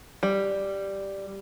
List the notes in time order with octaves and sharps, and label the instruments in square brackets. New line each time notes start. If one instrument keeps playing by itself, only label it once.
[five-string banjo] G3